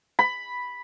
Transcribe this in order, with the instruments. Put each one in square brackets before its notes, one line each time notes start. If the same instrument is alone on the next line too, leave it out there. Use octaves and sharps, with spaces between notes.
[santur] B5